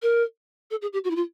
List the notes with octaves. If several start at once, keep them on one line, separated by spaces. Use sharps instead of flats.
A#4
A4
G#4
G4
F#4
E4
F4